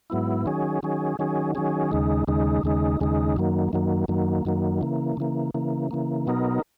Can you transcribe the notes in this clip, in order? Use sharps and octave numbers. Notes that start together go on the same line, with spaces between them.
G#2 F#3 B3 E4
D#3 F#3 C#4 G#4
D#3 F#3 C#4 G#4
D#3 F#3 C#4 G#4
D#3 F#3 C#4 G#4
D#2 C#3 G#3 D#4
D#2 C#3 G#3 D#4
D#2 C#3 G#3 D#4
D#2 C#3 G#3 D#4
F#2 D#3 F#3 A#3
F#2 D#3 F#3 A#3
F#2 D#3 F#3 A#3
F#2 D#3 F#3 A#3
C#3 E3 A#3
C#3 E3 A#3
C#3 E3 A#3
C#3 E3 A#3
B2 F#3 B3 D#4 A#4